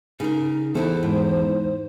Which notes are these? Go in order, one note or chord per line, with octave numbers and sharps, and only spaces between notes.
C#3 D#4 A#4
E2 E3 A4 C5
G#2